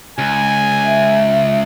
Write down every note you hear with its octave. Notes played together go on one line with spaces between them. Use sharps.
C#2 G#5
E5